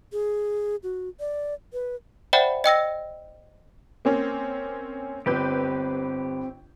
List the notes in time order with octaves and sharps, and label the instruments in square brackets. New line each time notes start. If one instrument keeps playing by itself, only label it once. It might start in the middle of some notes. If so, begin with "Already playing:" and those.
[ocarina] G#4
F#4
D5
B4
[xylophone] C5 D5 E5 F#5 G5 B5
D#5 G5 E6 A#6
[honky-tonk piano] A#3 C4 C#4
[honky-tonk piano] G1 B4 G6 [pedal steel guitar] C4 G4